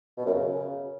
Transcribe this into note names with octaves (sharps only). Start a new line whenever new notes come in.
B2
F#2
C#3